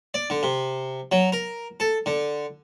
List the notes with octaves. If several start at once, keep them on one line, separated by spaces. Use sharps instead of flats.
D5
D3
C3
F#3
A#4
A4
D3